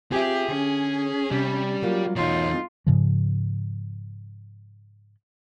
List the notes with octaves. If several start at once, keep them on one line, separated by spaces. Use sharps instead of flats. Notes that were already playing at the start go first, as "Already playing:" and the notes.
C4 F4 G4 G#4 E5
D3 C#4
C3 G3
F#3 A#3 F4
E2 B2 A3 D#4 F4 C#5
G#2 C#3 F3